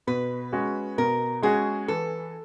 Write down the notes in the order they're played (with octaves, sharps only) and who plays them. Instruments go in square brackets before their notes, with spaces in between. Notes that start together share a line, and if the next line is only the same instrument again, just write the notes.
[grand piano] B2 [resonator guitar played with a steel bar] B4
[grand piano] G#3 C#4 F#4
[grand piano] B2 [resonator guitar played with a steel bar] A#4
[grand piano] G#3 C#4 F#4 [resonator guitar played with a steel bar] G#4
[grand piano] E3 [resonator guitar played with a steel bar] A4